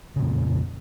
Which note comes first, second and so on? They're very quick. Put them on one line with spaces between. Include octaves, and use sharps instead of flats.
C#3 A#2 F2